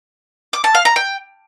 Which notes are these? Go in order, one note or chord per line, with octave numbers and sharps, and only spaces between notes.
D6
A5
F5
A#5
G5